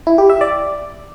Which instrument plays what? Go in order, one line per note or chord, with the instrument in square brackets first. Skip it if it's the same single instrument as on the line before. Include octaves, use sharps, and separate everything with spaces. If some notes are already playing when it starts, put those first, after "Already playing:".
[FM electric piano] E4
G4
E5
D5